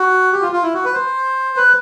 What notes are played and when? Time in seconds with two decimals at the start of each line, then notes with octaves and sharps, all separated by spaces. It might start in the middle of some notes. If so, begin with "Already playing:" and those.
Already playing: F#4
0.33 G4
0.42 F4
0.52 F4
0.63 E4
0.74 F#4
0.85 B4
0.94 C5
1.57 B4